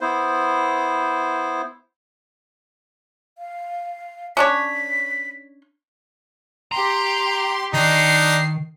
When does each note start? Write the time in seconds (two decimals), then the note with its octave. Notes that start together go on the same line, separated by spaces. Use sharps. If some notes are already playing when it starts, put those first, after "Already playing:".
0.01 B3 E4 C5
3.37 F5
4.37 C#4 D4 C#5 B6
6.72 G4 A#5 C6
7.74 D#3 D4 D#4 C7